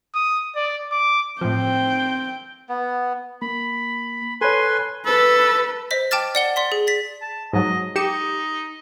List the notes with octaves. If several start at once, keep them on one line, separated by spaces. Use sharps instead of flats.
D#6
D5
D6
A2 F3 C4 G5
B3
A#3 B5
A4 B4 C#5 G#5 C6
A4 B4
C5 D#5 B6
G5 A5 D6 F6 A6
D5 F#5 G7
D5 C6 B6
G#4
A6 B6
A5
G#2 F#3 D#5
D#4 G4 C#7 E7